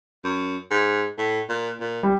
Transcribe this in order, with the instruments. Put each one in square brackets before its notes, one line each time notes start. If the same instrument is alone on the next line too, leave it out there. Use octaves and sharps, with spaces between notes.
[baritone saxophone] F#2
G#2
A2
A#2
A#2
[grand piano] G3